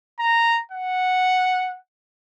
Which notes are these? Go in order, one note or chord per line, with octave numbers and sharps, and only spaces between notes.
A#5
F#5